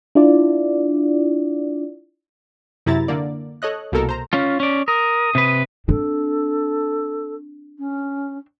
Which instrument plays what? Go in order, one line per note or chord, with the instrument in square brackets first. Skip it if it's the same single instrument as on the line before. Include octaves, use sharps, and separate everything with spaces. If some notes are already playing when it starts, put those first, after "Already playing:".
[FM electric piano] D4 E4 F4 D5
[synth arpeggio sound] F#2 C3 E4 A#5 A6
D3 A#3 D5
A4 C#5 D#5 F#6
C2 B2 A#3 A4 A#4
C5 A#5
[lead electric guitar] C#4 F4
C#4 D5
[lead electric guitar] A#4 [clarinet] D#6
[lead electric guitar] C3 B4
[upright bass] C4 D4 [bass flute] A4
[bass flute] C#4